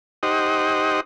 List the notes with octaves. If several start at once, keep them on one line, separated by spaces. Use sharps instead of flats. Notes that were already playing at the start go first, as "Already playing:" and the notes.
D#4 G4 C5 D#5 F#5